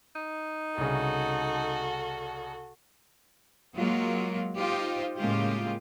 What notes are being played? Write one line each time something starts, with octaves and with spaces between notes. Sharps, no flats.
D#4
C2 C#3 F#4 A4
F#3 G#3 A#3 F4 A#4
D#4 F4 G4 C5
A2 C#3 G#3 A#3 F4 G4